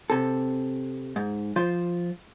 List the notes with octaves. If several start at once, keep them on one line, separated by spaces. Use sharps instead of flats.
C3 A4
G#2
F3 F4 C5